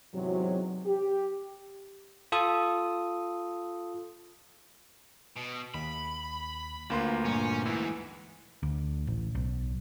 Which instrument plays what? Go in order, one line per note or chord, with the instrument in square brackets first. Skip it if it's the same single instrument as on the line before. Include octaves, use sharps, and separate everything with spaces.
[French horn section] E2 G#2 C3 F#3
G4
[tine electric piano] F4 A4 D#6
[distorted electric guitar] B2
[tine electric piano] D#2 [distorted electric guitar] B5
[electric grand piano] D2 A#3 C6 [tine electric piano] F4 B4
[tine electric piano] G2 A#2 [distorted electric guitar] C#4
[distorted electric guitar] G#2 [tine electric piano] E3
[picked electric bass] D2
A1
B1